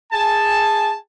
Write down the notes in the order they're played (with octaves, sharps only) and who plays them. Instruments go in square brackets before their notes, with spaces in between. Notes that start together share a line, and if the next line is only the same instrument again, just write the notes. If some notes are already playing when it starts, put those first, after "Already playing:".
[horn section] G#4 G#5 A5